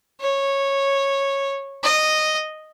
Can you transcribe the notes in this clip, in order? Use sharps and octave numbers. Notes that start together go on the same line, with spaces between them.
C#5
D#5